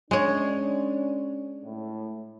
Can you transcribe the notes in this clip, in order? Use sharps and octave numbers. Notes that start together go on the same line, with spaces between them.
G#3 C#4 D4 C#5
A2